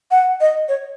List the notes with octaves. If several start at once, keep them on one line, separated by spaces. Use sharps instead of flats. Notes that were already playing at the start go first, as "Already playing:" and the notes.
F#5
D#5
C#5